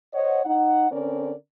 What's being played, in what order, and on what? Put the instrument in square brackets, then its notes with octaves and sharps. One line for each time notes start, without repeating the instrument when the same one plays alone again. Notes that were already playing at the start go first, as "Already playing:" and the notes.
[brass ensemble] C5 C#5 D#5 F#5
D#4 F#5
D3 C4 C#4 A#4 D5